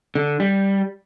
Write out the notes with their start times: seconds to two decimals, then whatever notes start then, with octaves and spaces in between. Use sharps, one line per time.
0.15 D3
0.40 G3